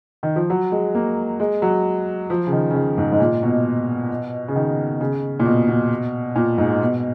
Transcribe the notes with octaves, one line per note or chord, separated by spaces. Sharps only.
D#3
F3
F#3
G#3
A#3
G#3
F#3
F3
C#3
D#3
C#3
D#3
G#2
G#2
A#2
B2
C#3
D#3
C#3
A#2
B2
B2
A#2
G#2
B2